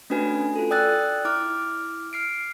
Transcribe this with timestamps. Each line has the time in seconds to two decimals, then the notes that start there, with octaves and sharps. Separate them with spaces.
0.10 A3 C#4 D4 F#4 B4 G#5
0.56 F4 A4
0.71 D5 G5 D#6 E6 F#6 A6
1.25 E4 D6 F6
2.13 F6 C7 D7